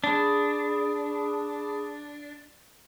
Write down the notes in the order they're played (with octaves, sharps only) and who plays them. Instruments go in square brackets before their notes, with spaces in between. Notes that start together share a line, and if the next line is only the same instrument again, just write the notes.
[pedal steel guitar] D4 [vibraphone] G#4 B5 D#6